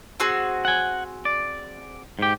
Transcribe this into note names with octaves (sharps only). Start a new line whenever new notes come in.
C4 F#4 G#4
F#5 G#5
D5
G#2 G4